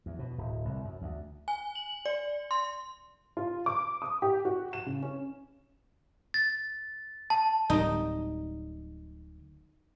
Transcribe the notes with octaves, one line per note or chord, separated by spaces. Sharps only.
E2
B2
D1
C2
F#2
D2
G#5
F#7
D5
C6
F4
D6
D#6
G4
F#4
E7
C#3
C#4
A6
A5
D1 G3 D#4